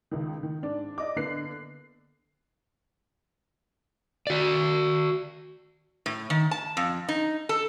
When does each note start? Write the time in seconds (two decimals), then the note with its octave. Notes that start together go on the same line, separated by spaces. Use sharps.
0.11 C#2 D#3
0.43 D#3
0.63 G#2 D4
0.98 D5 D#5 D6
1.16 D3 A#3 B3 F#6 C7
4.27 F#4 D5
6.06 A2
6.30 D#3
6.51 A5
6.77 F2
7.09 D#4
7.49 A4